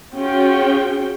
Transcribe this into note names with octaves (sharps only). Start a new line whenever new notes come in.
C#4 F4 F#4 G#4 G5